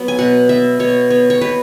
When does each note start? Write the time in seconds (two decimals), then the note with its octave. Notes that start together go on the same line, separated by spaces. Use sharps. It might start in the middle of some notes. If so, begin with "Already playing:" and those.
Already playing: F#3 B3
0.08 G#5
0.19 B2 F#5
0.49 B3 E5
0.79 B2 C#5
1.10 B3 C#5
1.30 C#5
1.41 B2 B4